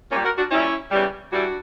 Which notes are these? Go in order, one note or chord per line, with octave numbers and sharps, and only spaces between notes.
A#2 G3 A#3 C#4
F#4 A#4
D4 F#4
A#2 G3 C#4 E4
E2 C#3 E3 G3
G2 E3 G3 D4 F#4